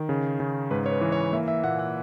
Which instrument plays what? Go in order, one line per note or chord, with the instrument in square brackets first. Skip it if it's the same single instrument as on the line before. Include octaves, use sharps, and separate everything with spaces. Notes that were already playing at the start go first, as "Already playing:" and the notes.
Already playing: [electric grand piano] D#3
C#3
C#3
G#2 B4
C#5
B4
E3
C#5
A#3 E5
E5
A#2 F#5
F#5